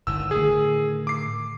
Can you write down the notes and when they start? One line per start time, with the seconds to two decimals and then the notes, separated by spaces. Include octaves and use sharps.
0.07 G1 A2 D#3 E6
0.31 A2 D3 D#3 G#4
1.07 D6 C7